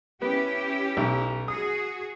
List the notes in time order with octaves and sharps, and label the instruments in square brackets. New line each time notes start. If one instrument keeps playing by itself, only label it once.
[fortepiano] B3 [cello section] C#4 E4 G4
[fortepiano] B1
[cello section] F#4 G#4 [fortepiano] D#6